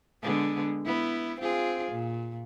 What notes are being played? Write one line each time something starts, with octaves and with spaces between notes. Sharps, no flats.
D3 G#3 B3
B3 E4
C4 F4 G#4
A#2